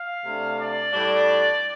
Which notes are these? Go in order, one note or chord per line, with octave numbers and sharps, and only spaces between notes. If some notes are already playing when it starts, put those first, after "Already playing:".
Already playing: F5
C3 A3 D4
D5
A2 G3 D4